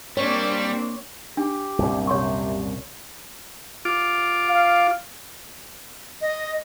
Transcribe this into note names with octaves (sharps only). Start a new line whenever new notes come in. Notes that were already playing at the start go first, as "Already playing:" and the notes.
G3 A#3 C4 D4 C#5
D4 G4
C2 F#2 A#2
C3 C#5 C6 C#6
F4 D6
F5
D#5